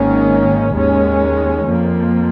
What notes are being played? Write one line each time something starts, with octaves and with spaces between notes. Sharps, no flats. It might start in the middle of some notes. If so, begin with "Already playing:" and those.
Already playing: G#1 G#2 D#3 A#3 C#4
D#2 D#3 G#3 C#4
F2 F3 A#3